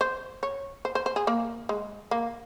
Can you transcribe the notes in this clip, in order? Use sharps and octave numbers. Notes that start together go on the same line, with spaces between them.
C5
C#5
C5
C5
C5
G#4
A#3
G#3
A#3